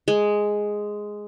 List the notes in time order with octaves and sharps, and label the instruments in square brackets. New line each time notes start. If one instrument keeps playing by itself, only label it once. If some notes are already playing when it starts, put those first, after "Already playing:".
[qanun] G#3